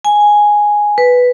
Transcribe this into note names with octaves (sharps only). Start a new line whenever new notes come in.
G#5
B4